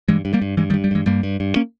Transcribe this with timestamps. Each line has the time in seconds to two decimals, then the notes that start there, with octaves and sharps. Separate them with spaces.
0.08 G2 E3 G#3
0.25 G2
0.33 G3 A#3
0.42 G2
0.57 G2 E3 G#3
0.70 D#3 G3
0.74 G2
0.84 G3
0.91 G2 E3 G#3
1.06 G2 G3 A#3
1.23 G2
1.40 G2
1.56 A#3 C#4